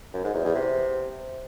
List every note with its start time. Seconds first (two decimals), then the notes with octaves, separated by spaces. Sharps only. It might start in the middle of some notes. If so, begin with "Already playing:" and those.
0.14 F#2
0.24 G#2
0.34 E2
0.45 E2
0.55 C3